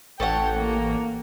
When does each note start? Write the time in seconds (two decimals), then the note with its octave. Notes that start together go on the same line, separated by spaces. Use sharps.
0.20 A1 A4 C#5 F#5 G5
0.58 A#3